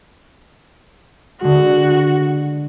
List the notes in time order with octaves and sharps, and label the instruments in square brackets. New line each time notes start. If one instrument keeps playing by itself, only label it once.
[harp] D3 G#3 [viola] F#4